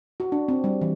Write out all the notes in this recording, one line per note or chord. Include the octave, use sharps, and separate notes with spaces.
F#4
D4
C4
G3
E3